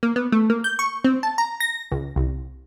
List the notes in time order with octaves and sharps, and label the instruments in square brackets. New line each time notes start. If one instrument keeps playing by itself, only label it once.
[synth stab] A#3
B3
A3
A#3
G6
C#6
C4
A5
A#5
A#6
C#2
C2